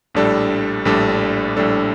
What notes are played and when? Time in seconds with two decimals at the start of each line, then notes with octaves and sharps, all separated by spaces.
0.15 A#1 A2 G3 D4 A4
0.85 A#1 A2 G3 D4 A4
1.56 A#1 A2 G3 D4 A4